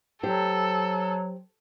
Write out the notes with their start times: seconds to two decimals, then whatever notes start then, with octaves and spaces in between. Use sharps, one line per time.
0.23 F#3 G4 A4 C5